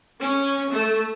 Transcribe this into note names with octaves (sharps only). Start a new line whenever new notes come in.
C#4
A3